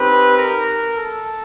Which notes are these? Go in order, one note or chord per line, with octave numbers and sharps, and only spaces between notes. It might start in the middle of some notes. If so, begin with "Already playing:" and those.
Already playing: C4 D#4 G4 B4
A#4
A4